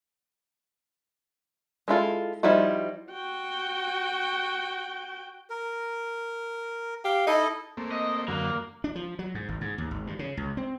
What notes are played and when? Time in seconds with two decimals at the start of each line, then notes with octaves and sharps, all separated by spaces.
1.88 G#3 E4 F4 A4
2.43 F3 G3 D#4 E4 F#4
3.12 F#4 G5
5.50 A#4
7.05 G4 F5
7.27 D#4 E4 A4 D#5
7.77 A3 A#3 C4
7.92 D#5
8.28 F#2 D3 F#3 A#3
8.84 D4
8.95 F3
9.19 F#3
9.35 G#2
9.49 G#1
9.61 G#2
9.78 D#2
9.91 G#1
10.07 G2
10.19 C#3
10.37 C#2
10.57 C4